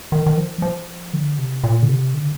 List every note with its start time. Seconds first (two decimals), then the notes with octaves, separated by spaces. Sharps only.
0.12 D#3
0.26 D#3
0.37 F3
0.62 F3
1.13 D3
1.39 C3
1.64 A#2
1.83 D3
1.89 C3
2.14 D3